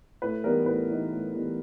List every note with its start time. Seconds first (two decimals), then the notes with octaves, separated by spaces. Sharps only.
0.22 A2 B4
0.44 E3 G3 B3 D#4 A#4
0.66 A2 B4
0.89 E3 G3 B3 D#4
1.11 A2
1.33 E3 G3 B3 D#4